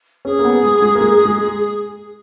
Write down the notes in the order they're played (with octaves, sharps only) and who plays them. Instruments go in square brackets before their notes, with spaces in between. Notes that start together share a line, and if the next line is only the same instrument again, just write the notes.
[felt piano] C#4 [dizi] G#4
[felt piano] A#3
B3
G#3
G#3
A#3
G#3
G#3